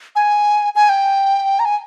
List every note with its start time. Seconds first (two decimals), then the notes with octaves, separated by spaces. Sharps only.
0.16 G#5
0.76 G#5
0.89 G5
1.60 A#5
1.65 G#5